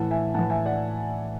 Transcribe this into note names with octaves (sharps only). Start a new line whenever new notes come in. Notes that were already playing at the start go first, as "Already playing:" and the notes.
Already playing: A2 E3 F#5 A5
E5 G#5
A2 E3 F#5 A5
E5 G#5
D5 F#5